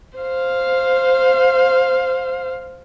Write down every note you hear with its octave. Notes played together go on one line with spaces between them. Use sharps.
C5 F5